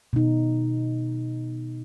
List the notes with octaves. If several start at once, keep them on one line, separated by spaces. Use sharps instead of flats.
B2 D#4